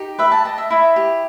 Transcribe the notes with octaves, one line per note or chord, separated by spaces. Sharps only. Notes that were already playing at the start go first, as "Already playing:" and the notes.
Already playing: D#4 G4
B4 E5
A5
D#5 A5
E5
E4 E5
G4